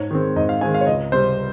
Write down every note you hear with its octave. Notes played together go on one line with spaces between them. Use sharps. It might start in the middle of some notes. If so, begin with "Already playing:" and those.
Already playing: G#2 C#5
D#3 G#3 C4
G#2 D#5
F5
D#3 G#3 C4 G#5
F5
C#5
C#2 D#5
C3 G3 C4 C5